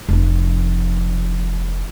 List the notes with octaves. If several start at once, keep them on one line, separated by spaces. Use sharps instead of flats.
F1 F3